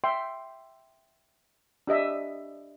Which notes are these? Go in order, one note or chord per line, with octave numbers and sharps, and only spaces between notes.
E5 G5 C6
D4 G4 D#5 E5